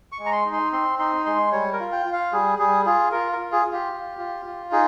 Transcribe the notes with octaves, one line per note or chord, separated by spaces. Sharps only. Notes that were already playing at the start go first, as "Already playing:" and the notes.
C#6
G#3
A#5
C6
D#4
C6
C4 C6
D#4 C6
G#3 C6
G3 C#5
A#4
F4
G5
F4
F5
G3 G#4
G3 G#4
F4 G#4
F4 A#4
A#4
F4
G#4
F4
G4
F4
F4
F4
D#4 G#4